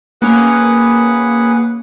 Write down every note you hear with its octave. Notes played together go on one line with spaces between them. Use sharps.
A#3 C#4 G#4 B4 F#5